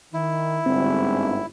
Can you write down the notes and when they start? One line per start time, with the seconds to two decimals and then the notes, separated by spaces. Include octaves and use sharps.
0.14 D#3 E4
0.66 G1 G#2 C4